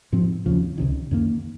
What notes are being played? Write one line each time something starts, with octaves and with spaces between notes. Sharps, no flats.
G#2 F3 C4
D#2 C#3 F3
C#2 C3 D#3
F#2 D#3 A#3